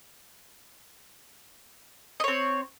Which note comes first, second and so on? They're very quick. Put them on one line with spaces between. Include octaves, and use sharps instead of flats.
D#5 C#5 C4